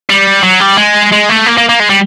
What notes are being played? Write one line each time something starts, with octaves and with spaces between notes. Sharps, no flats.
G3
F#3
G3
G#3
G#3
A3
A#3
A#3
A#3
G#3
G3